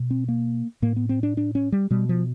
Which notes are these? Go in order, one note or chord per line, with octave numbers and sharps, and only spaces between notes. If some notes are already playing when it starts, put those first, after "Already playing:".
Already playing: B2
C4
A#3
A2 A#3
B3
C4
D4
D4
C#4
G3
B2 G3
F3